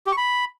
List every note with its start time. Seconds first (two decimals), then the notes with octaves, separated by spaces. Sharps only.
0.06 G4
0.12 C#6
0.17 B5